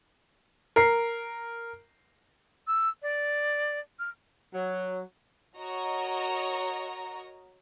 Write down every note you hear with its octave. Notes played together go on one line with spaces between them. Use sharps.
A#4 C7
E6
D5
F6
F#3
F#4 A#4 C#5 D#5 A#5